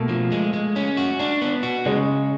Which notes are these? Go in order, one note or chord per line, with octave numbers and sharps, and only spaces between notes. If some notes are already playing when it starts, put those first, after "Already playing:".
Already playing: B2 A3 A#3
F3
G#3
G#3
C#4
F#4
D4
B3
F#4
C#3 G#3